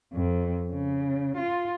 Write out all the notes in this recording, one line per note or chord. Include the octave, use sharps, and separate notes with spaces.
F2
C#3
F4